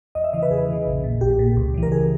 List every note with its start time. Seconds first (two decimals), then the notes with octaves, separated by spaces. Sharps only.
0.15 E2 D#5
0.24 E5
0.33 C#3 E3 D#5
0.42 B4
0.51 E2 G#4
0.68 C#3 E3
0.87 A#1
1.04 A#2
1.21 A#1 G4
1.39 A#2
1.56 C#2
1.74 C#3 E3
1.83 A#4
1.92 G#4